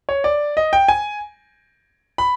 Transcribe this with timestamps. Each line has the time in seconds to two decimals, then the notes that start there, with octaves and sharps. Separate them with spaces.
0.09 C#5
0.24 D5
0.57 D#5
0.73 G5
0.88 G#5
2.18 B5